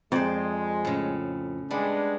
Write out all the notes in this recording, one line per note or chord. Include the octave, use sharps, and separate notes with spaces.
F2 G#3 C5 D5
A2 C#3
G3 G#3 B3 D4